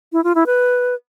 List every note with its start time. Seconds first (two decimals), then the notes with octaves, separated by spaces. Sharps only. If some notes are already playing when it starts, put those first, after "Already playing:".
0.13 E4
0.24 F4
0.35 E4
0.46 B4